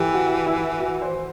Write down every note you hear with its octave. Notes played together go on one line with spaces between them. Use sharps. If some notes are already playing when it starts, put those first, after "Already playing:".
Already playing: E3 G4 A4
F#4
E4
F#4
C5